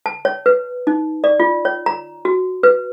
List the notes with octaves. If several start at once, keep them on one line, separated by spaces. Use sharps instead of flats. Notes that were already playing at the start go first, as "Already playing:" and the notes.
A5
C#5
B4
D#4
D5
F4
C#5
A#5
F#4
B4